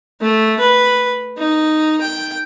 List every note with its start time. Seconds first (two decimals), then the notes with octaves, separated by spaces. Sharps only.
0.21 A3
0.60 B4
1.38 D#4
2.01 G5